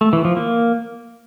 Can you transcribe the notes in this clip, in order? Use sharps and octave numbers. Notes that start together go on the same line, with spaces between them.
A3
E3
F3
A#3